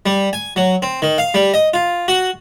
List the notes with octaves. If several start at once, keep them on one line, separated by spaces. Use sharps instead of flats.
G3
G#5
F#3
C4
D#3
F5
G3
D#5
F4
F#4